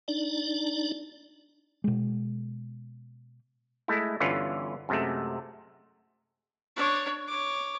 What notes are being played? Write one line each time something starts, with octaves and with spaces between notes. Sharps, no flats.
D4 D#4 D5
B2 G#3
G#3 A3 E4
G1 D3 E3 C#4 F4 B4
F#2 C3 G#3 A3
D4 C#5
C#5 D6